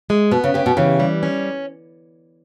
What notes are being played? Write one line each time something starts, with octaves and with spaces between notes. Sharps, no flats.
G#3
B2 B3
C#3
C#3 G4
B2
C#3 E3
G3
C#4